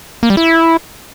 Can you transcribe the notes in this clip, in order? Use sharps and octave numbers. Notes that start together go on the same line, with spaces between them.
A#3
G3
E4